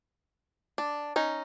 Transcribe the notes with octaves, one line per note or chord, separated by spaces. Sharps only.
D4
C#4 D#4